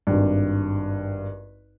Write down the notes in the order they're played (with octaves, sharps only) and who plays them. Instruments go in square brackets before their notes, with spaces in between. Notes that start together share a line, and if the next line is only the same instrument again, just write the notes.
[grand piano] G#1 G2